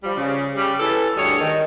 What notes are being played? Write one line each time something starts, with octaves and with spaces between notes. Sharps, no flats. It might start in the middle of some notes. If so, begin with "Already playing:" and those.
F3 G3
C#3
C#3 G3
E3 A4
D2 G2 G3 G#4 A4 C#5
D#3